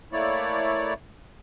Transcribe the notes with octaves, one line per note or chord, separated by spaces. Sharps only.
A3 A#3 E4 C#5 D5